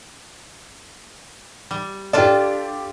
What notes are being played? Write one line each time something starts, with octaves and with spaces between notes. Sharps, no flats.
G3
D4 F4 G4 A4 D5